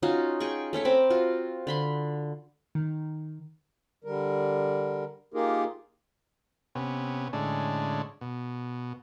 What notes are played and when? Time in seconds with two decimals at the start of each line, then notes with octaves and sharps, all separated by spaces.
0.02 C#4 D#4 F4 F#4
0.40 G#4 G5 C#6
0.73 A3 C#4 C#5 E5
0.85 C4 A#5 B5 D6
1.10 F4 F#4
1.67 D3 B5 C6
2.75 D#3
4.04 D3 G3 A#4
5.34 A#3 D#4 F4 G4 G#4 A#4
6.75 C3 B3 C#4
7.33 A2 D3 G#3 C#4 D4
8.21 B2